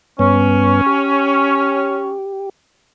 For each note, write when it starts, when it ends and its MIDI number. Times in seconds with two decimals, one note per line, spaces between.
0.19 0.81 43
0.19 0.81 59
0.19 2.13 61
0.86 2.49 67